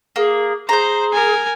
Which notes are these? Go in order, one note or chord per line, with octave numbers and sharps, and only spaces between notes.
A#3 G#4
G#4 C5 A#5 G6
A#4 G#5